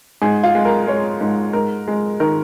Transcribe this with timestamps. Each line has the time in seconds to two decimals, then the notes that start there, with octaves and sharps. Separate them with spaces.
0.22 G#2 G#4
0.43 F4
0.55 G#3
0.65 A#4
0.87 G#3 C#5
1.21 G#2
1.53 G#2 A#4
1.87 G#3
2.20 D#3 A#4